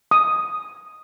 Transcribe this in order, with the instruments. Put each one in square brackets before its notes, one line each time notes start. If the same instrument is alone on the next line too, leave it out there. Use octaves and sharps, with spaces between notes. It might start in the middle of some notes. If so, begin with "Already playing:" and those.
[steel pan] D#6